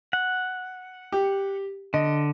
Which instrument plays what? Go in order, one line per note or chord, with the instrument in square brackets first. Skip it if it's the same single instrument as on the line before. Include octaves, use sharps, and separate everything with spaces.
[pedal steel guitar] F#5
[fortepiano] G4
[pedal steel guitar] D3 [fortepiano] D#5